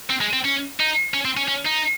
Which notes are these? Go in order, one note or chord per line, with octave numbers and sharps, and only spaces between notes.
C4
G#3
C4
C#4
D#4
C#4
C4
C#4
C#4
D#4